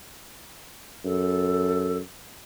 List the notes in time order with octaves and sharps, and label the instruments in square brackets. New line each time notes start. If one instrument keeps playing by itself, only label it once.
[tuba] F#2 [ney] A4